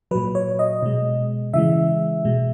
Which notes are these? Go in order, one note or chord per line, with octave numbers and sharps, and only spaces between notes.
A#2 F#3 B4
C#5
D#5
B2 G#3
C#3 E3 G#3 E5
B2 G#3